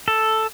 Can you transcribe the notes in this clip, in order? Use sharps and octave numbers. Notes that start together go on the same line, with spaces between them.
A4